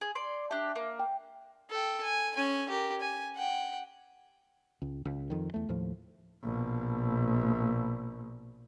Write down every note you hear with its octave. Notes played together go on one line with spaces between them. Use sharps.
G#4
D5 C6
D4 G4 E5
A#3
G5
A4 G5
G#5
C#4 G#5
G4 A#4
G#5
F#5 G5
C#2
C#2
F2 D#3
E2 A3
D#2 A2 F3
A#1 B2